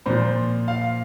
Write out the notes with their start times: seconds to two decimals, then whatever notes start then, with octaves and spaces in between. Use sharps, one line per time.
0.06 A#2 F3 C5
0.68 F5